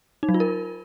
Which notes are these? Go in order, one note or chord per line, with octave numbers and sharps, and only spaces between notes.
D#4
F#3
F4
A#4